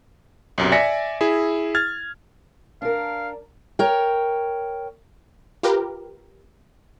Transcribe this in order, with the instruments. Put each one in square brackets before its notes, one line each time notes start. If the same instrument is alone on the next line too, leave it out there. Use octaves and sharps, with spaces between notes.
[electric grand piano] B1 F#2 C3
D5 E5 G#5 A#6 B6 C#7
E4 G#4 E5
F6 G#6 A6
[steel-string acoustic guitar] D4 A#4 [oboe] F5
[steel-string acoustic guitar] A#4 C#5 G5
[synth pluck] F4 G4 A#4 B4